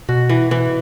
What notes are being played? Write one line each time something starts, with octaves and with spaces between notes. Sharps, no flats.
B2 F#4
E3
E3